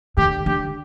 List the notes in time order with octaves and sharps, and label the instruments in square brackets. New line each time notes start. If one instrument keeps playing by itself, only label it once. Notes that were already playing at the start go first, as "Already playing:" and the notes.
[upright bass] D3 [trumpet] G4
[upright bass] D3 [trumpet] G4